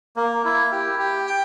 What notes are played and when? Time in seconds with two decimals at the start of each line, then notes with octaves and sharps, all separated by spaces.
0.16 A#3
0.45 E4
0.72 G4
0.99 G4
1.27 G5